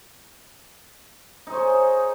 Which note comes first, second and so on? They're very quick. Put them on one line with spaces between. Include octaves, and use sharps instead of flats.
D#4 C5 C#5 G#4